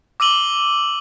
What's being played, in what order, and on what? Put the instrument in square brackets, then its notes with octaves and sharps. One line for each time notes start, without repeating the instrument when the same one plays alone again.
[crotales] D6 E6 D#7 F#7 G7